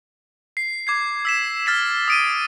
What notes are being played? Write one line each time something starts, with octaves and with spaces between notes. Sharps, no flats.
C7
D6 G#6 C7
E6 B6 E7
F6 A6 B6 E7
D#6 D7 D#7